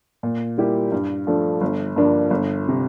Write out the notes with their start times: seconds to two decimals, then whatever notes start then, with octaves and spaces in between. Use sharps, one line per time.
0.23 A#2
0.58 G3 A#3 E4 G4
0.92 G2
1.27 F3 A3 D4
1.61 G1
1.96 G2 F3 A#3 D4
2.30 G1
2.69 C3